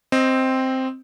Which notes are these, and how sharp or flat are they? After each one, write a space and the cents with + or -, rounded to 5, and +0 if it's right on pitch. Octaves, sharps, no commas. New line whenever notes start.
C4 +0 D#5 +0